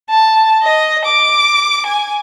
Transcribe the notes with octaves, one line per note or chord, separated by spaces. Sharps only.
A5
D#5
D6
G#5